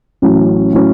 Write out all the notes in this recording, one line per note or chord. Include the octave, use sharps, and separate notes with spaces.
A1 A2 F#3 C#4
A2 F#3 C#4